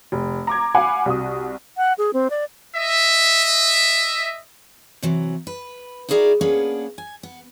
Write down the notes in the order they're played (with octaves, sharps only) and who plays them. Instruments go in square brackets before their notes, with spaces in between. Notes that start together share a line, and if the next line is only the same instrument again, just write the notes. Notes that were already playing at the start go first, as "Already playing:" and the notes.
[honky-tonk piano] F1
A#5 D6 G#6
F5 F#5 G#5 B5 D6
C2 F#4 D#6
[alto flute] F#5
G#4
C4
D5
[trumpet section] D#5 E5
[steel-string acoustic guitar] C3 E3 F#3
B4
D#4 E4 F#4 G#4 A#4 D5
A#3 B3 C#4 D4 G#4 B4
G#5
B3